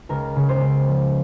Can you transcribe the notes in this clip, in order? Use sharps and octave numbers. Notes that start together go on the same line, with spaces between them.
C#2 A#4
C#3
C5
C#2
F3